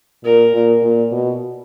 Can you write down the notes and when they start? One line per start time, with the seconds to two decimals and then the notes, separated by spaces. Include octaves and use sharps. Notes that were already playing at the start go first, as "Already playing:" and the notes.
0.24 A#2 A#4
0.54 A#2
0.83 A#2
1.12 B2